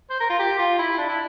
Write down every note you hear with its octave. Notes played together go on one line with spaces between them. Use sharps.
C5
A#4
F4
G4
F4
E4
D4
E4